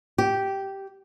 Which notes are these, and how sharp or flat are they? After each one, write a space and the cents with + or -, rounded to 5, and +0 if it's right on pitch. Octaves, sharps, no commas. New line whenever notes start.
G4 -10